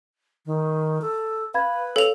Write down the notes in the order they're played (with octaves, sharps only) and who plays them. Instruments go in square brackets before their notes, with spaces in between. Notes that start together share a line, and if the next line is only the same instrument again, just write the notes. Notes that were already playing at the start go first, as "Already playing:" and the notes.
[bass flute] D#3
A4
[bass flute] B4 [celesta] F5 B5 G#6
[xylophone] A4 F7 [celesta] C#5 F5